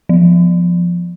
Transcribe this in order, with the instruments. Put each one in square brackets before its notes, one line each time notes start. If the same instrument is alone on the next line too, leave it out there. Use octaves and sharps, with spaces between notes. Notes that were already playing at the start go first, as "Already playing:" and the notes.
[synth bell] F3